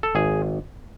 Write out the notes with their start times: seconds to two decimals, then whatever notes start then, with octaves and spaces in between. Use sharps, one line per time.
0.03 A4
0.15 G#1 G#4